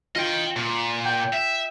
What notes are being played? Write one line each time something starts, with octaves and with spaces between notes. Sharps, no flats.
F4 D#5 G5
A#2
G5
E5